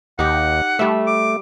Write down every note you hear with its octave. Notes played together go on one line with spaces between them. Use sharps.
D#2 D#4 G4 F#5
G3 A3 E5
D6